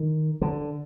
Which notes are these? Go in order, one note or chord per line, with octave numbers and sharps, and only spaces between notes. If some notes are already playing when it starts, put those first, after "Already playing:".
Already playing: D#3
D3